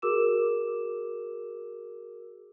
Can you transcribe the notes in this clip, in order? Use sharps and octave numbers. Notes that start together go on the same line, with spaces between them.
F#4 G#4 A#4 D6 E6 E7